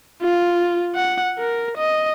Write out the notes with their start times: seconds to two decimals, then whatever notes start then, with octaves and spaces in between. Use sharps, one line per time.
0.22 F4
0.95 F#5
1.39 A#4
1.77 D#5